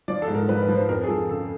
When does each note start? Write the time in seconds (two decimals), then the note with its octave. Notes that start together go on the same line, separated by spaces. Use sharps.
0.08 F3 D5
0.22 A4
0.28 G#2
0.35 A#4
0.48 F3 B4
0.63 B4
0.69 F3
0.76 C5
0.89 F2 A#4
1.04 G#4
1.09 F3 A4
1.29 C#3 A4